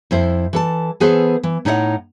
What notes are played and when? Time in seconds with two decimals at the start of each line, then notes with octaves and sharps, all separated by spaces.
0.11 F2 E4 C5
0.53 E3 A4 A5
1.00 E3 B3 G#4 A4 B4 C5
1.43 E3
1.65 A2 D#4 E4 C#5 D#5 F#5